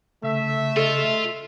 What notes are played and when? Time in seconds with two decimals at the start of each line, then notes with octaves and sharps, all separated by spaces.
0.23 C#3 A3 E5
0.76 F4 A4 D#5